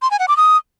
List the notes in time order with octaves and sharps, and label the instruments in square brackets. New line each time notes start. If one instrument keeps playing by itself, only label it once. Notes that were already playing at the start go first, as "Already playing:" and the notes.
[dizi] C6
G#5
F#5
D6
D#6